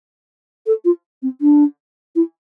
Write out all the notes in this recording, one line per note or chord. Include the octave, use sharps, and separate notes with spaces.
A4
F4
C4
D4
E4